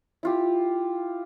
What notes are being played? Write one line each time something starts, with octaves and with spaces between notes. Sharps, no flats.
E4 F4 G4